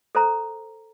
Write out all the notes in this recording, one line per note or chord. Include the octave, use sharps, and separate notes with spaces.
A4 C5 A#5